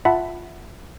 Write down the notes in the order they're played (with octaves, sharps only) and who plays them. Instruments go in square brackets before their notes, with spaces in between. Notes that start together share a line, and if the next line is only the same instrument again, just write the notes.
[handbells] F4 E5 F#5 A5 B5